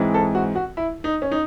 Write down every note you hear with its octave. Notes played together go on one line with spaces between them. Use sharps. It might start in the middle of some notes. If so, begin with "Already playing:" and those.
Already playing: G#2 E3 G#3 C4
A4
F#4
F#4
E4
D#4
C#4
D#4